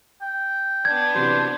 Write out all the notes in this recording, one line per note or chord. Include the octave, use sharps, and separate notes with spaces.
G5
B3 D4 G#6
C3 E3 F#3 C5